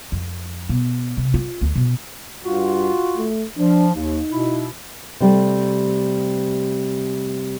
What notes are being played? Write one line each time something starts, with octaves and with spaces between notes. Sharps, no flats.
F2
B2
C3
F4
D2
B2
G2 F4 F#4
A3
F3 D4
D#2 D#4
B2 E4
C3 G3 A3